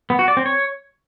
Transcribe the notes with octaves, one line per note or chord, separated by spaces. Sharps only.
B3
F#4
D5
C4
C#5